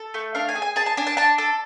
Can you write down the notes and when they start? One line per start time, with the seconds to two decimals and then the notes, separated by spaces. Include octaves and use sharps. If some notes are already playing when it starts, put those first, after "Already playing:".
Already playing: A4
0.14 A3
0.35 D4 F5
0.49 G#5
0.56 G#4
0.62 G#5
0.76 G#4 A5
0.86 A5
0.97 D4 G#5
1.07 A5
1.17 D4 A5
1.38 A4